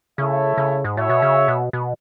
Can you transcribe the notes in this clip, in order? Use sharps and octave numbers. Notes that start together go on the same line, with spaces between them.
C#3 A3 E4 A4 C#5 E5
C#3
G#2
A2 F#4 C#5 E5
B2
C#3
B2
B2